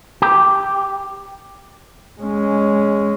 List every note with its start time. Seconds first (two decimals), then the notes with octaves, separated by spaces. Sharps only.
0.22 G4
2.21 G#3 C#4